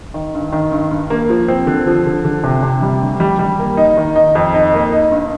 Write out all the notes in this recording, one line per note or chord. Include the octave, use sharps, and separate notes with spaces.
D#3
G2
D#3
G2
G2
A#3
F3
C4
D3
F3
D3
D3
C3
C3
G3
D2
G3
G3
A#3
D#4
D#3
D#4
F2
D#4
A#3
D#4
G2